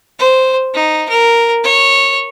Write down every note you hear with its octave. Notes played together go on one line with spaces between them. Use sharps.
C5
D#4
A#4
C#5